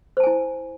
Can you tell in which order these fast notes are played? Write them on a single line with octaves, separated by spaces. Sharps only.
C5 A5 G#5 E4